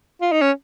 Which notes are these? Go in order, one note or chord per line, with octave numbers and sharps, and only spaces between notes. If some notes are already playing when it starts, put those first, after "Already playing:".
F4
D#4
C#4